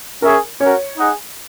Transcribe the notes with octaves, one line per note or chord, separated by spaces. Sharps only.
C#4 G#4 A#4 C#5 E5
C#4 F#4 A#4 C#5
D#4 G#4 D#5 F#5